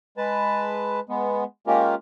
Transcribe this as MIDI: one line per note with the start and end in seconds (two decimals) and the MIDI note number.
0.17 1.00 56
0.17 1.00 71
0.17 1.00 81
1.09 1.44 56
1.09 1.44 59
1.67 1.95 56
1.67 1.95 58
1.67 1.95 61
1.67 1.95 65
1.67 1.95 67
1.67 1.95 70